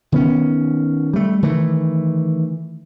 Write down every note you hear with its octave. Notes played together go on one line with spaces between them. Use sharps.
D#3 B3 C#4
G3 A3
D#3 E3 A3